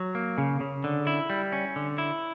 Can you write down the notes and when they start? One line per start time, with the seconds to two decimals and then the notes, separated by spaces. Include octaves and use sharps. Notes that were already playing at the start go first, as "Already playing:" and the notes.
Already playing: F#3
0.15 A#3
0.38 C#3
0.60 C#3
0.84 D3
1.07 E4
1.30 G3
1.52 C#4
1.76 D3
1.98 E4